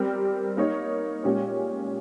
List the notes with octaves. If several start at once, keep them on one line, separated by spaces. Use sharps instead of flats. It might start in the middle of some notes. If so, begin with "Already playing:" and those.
Already playing: G3 C4 G4 A#4
A#3 D#4 A#4 C#5
A#2 G#3 C#4 G4 C#5